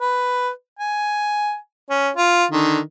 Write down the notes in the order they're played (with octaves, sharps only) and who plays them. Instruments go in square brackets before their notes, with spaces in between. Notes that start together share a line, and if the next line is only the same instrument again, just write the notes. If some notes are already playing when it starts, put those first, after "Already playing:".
[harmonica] B4
G#5
C#4
F4
D3 D#3